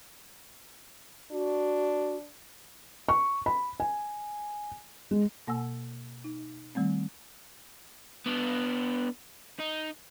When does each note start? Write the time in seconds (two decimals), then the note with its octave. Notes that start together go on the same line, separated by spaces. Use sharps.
1.32 D4 F#4
3.09 C#6
3.46 B5
3.80 G#5
5.11 G#3
5.47 B2 A#3 F#5 G#5 E6
6.24 D#4
6.75 D#3 G3 A3 C4
8.26 B3 D4
9.60 D#4